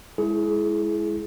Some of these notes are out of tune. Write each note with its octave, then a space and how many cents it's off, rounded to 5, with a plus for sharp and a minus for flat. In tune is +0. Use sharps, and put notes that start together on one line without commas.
G#3 +0 E4 +5 G#4 +25